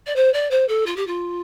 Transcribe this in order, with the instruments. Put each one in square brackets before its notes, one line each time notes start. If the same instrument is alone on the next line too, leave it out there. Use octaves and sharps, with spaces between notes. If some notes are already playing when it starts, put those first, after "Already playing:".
[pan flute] D5
C5
D5
C5
A4
F4
G4
F4